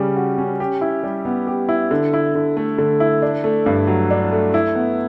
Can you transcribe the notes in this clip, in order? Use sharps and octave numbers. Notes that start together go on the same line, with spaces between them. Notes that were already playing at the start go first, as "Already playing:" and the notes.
Already playing: C#3 G3 C#4
F#4
C#4
G4
E4
G3
B3
G4
E4
D3
E4
D3
A3
D3
E4
D4
A3
G2
F#3
D4
A3
E4
B3